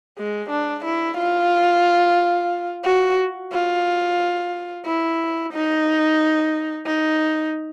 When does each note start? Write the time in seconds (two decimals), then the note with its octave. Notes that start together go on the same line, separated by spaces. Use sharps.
0.18 G#3
0.50 D4
0.85 E4
1.17 F4
2.84 F#4
3.52 F4
4.86 E4
5.53 D#4
6.87 D#4